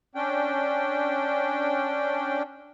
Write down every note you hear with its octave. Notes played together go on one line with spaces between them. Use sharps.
C#4 D4 G5